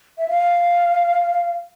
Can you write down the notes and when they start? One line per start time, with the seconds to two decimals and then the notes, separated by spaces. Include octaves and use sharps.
0.18 E5
0.28 F5